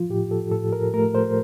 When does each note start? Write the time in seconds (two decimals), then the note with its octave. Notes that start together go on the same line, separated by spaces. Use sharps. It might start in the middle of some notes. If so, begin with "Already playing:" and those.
Already playing: F3 F4
0.09 A2 G4
0.31 A4
0.51 A2 A4
0.73 A#4
0.94 A3 A#4
1.15 C5